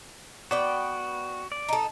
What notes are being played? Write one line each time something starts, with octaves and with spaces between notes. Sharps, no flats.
B3 F#4 D5 G5
D5
D#4 A4